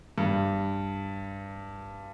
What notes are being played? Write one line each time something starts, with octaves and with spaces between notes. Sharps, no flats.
G2